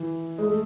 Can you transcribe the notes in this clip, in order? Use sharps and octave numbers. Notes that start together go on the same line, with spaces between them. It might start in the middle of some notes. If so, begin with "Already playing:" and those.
Already playing: E3
G#3
A3